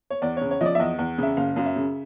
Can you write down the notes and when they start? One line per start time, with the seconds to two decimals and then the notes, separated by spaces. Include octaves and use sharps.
0.10 C#5
0.22 E2 D5
0.37 C#3 C#5
0.51 C#5
0.61 F3 D#5
0.66 D5
0.75 E5
0.79 E2 D#5
0.99 E2
1.18 C#3 E5
1.37 F#1 F5
1.56 F#2 F5
1.66 E5
1.76 C#3